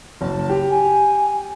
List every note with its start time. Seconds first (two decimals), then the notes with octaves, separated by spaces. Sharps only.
0.21 F#1 A5
0.49 G4
0.70 G#5